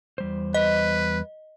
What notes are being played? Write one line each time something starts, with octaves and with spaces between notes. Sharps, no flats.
E2 G3 C5
B4 D#5